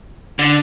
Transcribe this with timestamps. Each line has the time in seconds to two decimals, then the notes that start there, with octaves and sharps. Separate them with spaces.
0.39 D3